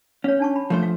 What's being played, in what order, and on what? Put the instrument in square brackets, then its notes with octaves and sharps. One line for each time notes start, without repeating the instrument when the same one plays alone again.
[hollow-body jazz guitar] C#4 [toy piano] C#5 F5
[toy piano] D4 A5 C#6
B5
[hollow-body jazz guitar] F3 A3 C5
[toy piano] F5